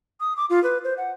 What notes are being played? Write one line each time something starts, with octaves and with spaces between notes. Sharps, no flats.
D#6
D6
F4
B4
C5
F#5